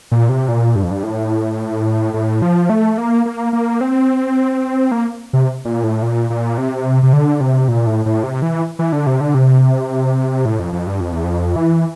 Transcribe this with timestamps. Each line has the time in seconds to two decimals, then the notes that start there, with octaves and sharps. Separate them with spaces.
0.12 A#2
0.29 C3
0.48 A#2
0.76 G2
0.83 F2
0.91 G2
1.03 A2
2.14 A2
2.42 F3
2.70 A3
2.98 A#3
3.25 A#3
3.53 A#3
3.81 C4
4.92 A#3
5.33 C3
5.65 A#2
5.84 A2
6.02 A#2
6.30 A#2
6.58 C3
7.03 C3
7.13 D3
7.41 C3
7.68 A#2
7.87 A2
8.06 A2
8.23 C3
8.42 E3
8.79 E3
8.92 D3
9.07 C3
9.21 D3
9.34 C3
10.45 A2
10.60 F2
10.73 F2
10.87 G2
11.00 F2
11.13 E2
11.24 F2
11.56 E3